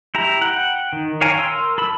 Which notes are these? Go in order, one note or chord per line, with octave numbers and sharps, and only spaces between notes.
E4 G4 A#5
F#5 G5
D#3
C#5 F5 G5 G#5 A#5
A#4 C6 E6
A4 B5 E6